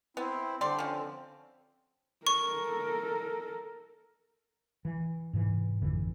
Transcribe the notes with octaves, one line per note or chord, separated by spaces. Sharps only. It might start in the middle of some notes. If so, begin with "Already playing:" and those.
B3 C4 E4
D3 G3 C4 D5 C6
F3 C#4
A4 A#4 C#6
E3
G#2 C3 E3
G#1 F2 D3 E3